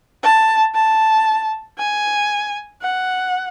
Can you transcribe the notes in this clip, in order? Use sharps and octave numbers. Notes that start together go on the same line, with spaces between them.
A5
A5
G#5
F#5